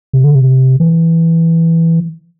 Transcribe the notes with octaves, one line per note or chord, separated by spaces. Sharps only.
C3
D3
C3
E3